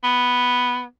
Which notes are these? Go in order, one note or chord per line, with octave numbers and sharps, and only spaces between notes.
B3